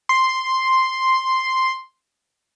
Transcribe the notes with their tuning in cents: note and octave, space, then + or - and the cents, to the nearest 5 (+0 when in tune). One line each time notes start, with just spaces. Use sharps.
C6 +0